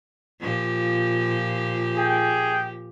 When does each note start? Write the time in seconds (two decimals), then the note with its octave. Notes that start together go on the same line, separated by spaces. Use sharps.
0.40 A#2 F3 G4
1.97 G#4 G5